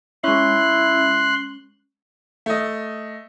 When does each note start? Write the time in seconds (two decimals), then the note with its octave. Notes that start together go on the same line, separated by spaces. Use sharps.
0.24 G#3 C#4 E4 C6 F#6
2.46 A3 D#5